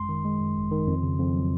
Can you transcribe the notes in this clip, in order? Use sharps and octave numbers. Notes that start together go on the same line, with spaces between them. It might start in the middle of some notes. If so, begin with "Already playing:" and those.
Already playing: G#1 F#2 G#3 C6
D#3
G#3
F#2
G#1
D#3
F2
C#3
F2
F#3